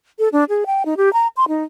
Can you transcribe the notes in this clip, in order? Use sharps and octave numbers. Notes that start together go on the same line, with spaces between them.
A4
D4
G#4
G5
D#4
G4
A#5
C6
D#4